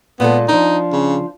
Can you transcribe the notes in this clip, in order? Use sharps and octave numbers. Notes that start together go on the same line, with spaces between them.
A#2 G#3 B3 A4
F3 D4 D#4
C#3